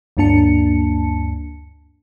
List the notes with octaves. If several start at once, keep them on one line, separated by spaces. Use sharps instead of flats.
D2 G2 A#3 D4 A5 C#7